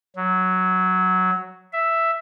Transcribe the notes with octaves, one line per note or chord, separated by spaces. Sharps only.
F#3
E5